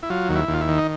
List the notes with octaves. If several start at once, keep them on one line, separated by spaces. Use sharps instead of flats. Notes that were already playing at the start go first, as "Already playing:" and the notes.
E4
F#3 F4
D#2
E4
D#2
F4
E4
D#3
D#4